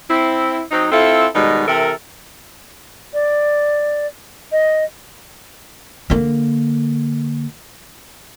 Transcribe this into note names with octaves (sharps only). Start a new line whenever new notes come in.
C4 E4
F#3 C4 D#4
C4 E4 F4 A4
B2 D#3 G3 G#3 D#4
C3 E3 A4 A#4
D5
D#5
D3 A#3